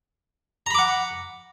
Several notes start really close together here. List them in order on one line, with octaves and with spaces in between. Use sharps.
A#5 B5 D6 F#5